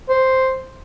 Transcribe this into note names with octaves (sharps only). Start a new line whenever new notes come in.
C5